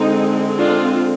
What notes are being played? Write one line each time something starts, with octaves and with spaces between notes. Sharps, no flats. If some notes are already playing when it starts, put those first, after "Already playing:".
Already playing: D3 G#3 C4 D#4
D4 F4